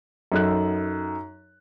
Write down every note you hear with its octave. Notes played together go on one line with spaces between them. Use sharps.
F#2 D#4 A4 F#6